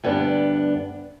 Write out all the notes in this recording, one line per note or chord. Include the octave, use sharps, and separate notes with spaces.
D2 G2 B3 D4